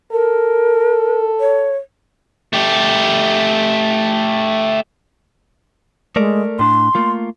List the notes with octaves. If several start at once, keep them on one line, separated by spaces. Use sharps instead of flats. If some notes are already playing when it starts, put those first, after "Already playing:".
A4 A#4
C#5
A3 G4
G#3 A3 A#4 D5
A2 D4 C6
A3 A#3 F4